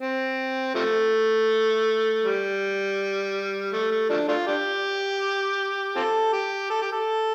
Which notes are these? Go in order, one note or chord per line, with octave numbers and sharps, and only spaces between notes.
C4
C3 F3 A3
G3
A3
A3
F3 A3 D4
A3 D4 F4
D4 G4
C4 F4 A4
G4
A4
G4
A4